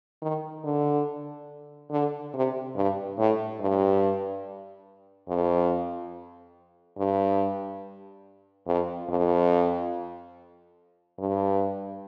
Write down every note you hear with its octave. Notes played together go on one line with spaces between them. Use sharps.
D#3
D3
D3
C3
G2
A2
G2
F2
G2
F2
F2
G2